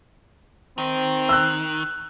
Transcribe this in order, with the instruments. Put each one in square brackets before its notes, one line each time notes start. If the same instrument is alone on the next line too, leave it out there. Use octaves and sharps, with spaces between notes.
[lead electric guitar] D#3 [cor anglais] C4
[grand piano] E6 F#6